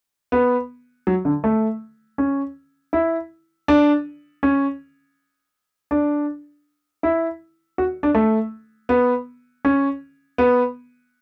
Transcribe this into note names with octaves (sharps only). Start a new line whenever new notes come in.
B3
F#3
D3
A3
C#4
E4
D4
C#4
D4
E4
F#4
D4
A3
B3
C#4
B3